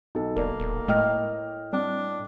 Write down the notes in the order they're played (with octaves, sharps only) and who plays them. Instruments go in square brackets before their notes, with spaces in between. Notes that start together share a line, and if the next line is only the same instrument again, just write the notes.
[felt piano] B1 A4 [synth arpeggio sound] D#4
[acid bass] E1 [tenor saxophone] A#3 [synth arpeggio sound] A#4 D5
[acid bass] D#1
[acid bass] A2 [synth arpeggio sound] G#3 A3 [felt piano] D#5 G5 F6
[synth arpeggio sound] G3 C4 [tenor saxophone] D4